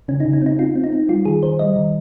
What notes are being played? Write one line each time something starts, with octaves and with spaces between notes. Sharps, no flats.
C#3 C#4
D#4
C#3
C#4
C4 D#4
C4 F4
C4
D#4
C4
G3 F4
D#3 G#4
D#3 C5
G3 D#5
D#3